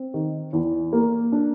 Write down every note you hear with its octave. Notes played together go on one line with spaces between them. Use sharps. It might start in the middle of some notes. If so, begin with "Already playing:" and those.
Already playing: C4
D#3
E2
A#3
D4